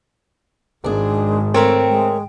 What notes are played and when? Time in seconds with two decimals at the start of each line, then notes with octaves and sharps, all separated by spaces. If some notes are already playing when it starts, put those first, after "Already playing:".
0.84 G#1 G#3 D4 G#4
1.54 A3 C4 A#4 C#5
1.89 G#3